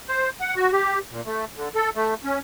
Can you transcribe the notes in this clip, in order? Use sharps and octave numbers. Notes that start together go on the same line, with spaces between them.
C5
F#5
F#4
G4
A#2
A3
D3
A4
A3
C#4